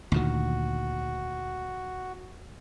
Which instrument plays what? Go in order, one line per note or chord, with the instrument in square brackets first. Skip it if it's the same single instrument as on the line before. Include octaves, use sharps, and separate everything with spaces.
[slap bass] D2 A#2 D#3 [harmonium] F#4